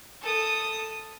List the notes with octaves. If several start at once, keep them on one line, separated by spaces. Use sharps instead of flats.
A4 D#6